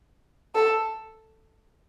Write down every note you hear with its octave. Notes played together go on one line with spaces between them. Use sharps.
A4